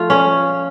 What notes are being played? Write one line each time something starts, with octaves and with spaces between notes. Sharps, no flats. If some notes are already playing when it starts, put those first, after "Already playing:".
Already playing: F3 A3 F4
C#4